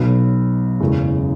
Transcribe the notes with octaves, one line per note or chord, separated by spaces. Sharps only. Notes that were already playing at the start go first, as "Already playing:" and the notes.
Already playing: B1 B2 F#3 B3
F#1 E2 C#3 G#3